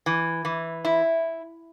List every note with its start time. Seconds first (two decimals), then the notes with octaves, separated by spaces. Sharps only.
0.06 E3
0.45 E3
0.85 E4